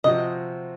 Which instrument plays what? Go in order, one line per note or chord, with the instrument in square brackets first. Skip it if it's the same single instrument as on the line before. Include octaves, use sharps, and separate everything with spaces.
[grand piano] C3 F3 C4 F#4 [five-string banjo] D#5